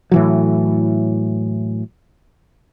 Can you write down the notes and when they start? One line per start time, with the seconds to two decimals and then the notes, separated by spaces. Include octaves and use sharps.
0.11 A2 E3 F#3